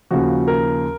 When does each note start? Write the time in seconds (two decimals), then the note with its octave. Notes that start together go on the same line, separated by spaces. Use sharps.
0.11 D#2 C#3 F3 F#4
0.48 A#4